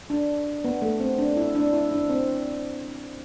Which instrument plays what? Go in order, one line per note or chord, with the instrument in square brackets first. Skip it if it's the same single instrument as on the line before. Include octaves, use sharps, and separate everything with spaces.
[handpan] D4
B3
A3
C4
D4
E4
D4
E4
D4
C4